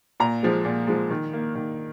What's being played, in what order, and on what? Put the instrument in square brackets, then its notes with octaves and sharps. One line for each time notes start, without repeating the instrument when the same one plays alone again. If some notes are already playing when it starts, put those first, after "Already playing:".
[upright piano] A#2 A#5
F3 G#3
A#2
F3 G#3
D#3
A#3
D#3